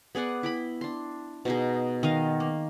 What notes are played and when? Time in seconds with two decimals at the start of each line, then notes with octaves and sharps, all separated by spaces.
0.15 B3 G#4 D5 F#5
0.43 E4 G5 B5
0.81 D4 C6
1.45 B2 D#4 G#4
2.03 D#3 D#5 F5
2.40 A#3